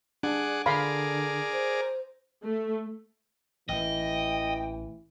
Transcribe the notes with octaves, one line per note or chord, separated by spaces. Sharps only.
D4 G#4 D5 F#5
D3 G#4 A#4 D5 F5 B5 C6
C5
A3
A1 A#2 E3 D#5 G5